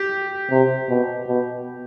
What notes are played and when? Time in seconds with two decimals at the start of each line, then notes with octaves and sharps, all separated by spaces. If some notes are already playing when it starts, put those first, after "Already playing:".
Already playing: G4
0.50 C3
0.89 B2
1.28 B2